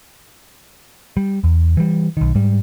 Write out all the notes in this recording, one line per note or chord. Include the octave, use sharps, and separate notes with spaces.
G3
E2
E3 G3
B1 D#3
G#2 G3